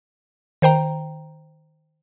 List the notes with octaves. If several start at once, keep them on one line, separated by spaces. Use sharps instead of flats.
D#3 C5 G5 A#5